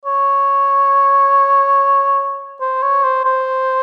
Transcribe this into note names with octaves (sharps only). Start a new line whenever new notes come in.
C#5
C5
C#5
C5
C5